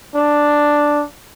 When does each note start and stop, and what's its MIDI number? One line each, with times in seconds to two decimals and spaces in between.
0.15 1.04 62